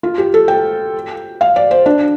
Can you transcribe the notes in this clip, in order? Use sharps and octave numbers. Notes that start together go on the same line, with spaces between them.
F4
G4
A4
G5
F5
D5
C5
D4